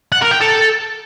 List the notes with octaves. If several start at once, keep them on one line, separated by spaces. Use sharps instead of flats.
F#5
A#4
G5
A4